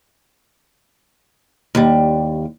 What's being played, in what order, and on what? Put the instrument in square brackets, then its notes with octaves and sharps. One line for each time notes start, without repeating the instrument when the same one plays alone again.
[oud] D#2 G3